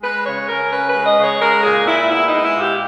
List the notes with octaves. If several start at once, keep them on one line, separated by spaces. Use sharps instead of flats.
G#3 B4
C#3 C#5
C#3 A#4
C#4 B4
B4
G#3
D#5
C#3
C#5
G#3 A#4
A#2 G#4
A#2 E4
B3 E4
D#4
G#3
E4
A#2
G4